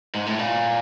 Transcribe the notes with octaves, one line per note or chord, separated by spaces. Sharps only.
G#2
A2
A#2